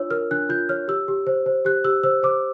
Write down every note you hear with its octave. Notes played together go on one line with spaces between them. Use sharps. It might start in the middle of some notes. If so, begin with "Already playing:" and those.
Already playing: D4 F4 C#5 E6
A#4 F6
D4 F#6
F4 G6
C#5 F6
G4 E6
G4
C5
C5
G4 F#6
G4 E6
C5 E6
C5 D6